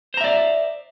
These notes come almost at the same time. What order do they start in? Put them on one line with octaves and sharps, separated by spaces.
C5 A#5 E5 D5